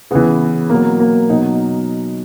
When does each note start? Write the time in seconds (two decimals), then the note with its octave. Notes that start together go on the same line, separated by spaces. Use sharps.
0.11 C#3 E3 B3
0.70 B2 F#3 A#3
1.00 A#3
1.30 B2 F#3 D#4